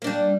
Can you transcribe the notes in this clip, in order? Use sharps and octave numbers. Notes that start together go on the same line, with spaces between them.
G3 A#3 D4